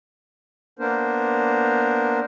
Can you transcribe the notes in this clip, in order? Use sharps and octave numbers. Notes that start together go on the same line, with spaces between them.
A#3 B3 D4 A#4 C5